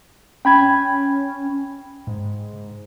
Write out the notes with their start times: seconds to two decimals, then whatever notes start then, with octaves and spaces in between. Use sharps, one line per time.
0.45 C#4 G5 B5 G#6
2.07 G#2